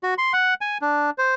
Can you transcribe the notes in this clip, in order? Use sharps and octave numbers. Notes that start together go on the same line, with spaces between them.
F#4
C6
F#5
G#5
D4
C5